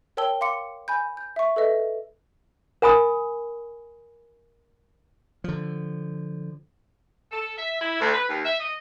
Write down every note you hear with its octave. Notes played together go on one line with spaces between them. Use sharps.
A#4 C#5 G5 A5 E6 G7
F5 C6 D6 C#7
G#5 B5 G6
G6
E5 C#6
A4 B4 D#5 E5
A#4 G#5 B5 D#6
D3 F3
A4
E5
E4
D2
B4
D#2
E5
D#5